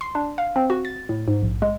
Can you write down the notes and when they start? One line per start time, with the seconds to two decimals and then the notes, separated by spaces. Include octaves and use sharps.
0.01 C6
0.15 D4
0.38 F5
0.56 C4
0.70 F#4
0.85 A6
1.09 A2
1.28 G#2
1.42 A#1
1.62 G#3